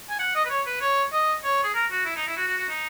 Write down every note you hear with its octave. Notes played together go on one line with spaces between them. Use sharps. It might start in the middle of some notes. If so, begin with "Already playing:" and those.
G#5
F#5
D#5
B4
C#5
B4
C#5
D#5
C#5
G#4
A#4
F#4
E4
D#4
E4
F#4
F#4
F#4
D#4